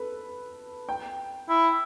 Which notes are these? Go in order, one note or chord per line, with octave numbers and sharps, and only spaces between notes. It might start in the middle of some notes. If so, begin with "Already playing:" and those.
Already playing: A4 B4
G5
E4